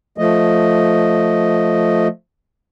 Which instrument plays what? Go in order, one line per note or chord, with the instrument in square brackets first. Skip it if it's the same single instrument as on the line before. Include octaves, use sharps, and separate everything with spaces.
[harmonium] F3 A3 D#5